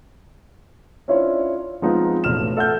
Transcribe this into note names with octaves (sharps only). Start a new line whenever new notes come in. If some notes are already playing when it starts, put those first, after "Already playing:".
C#4 D4 E4 F4 C5 C#5
F3 G#3 B3 C4 D#4 F4
E1 A2 F6 E7
A4 E5 F#5 E6 F6 G6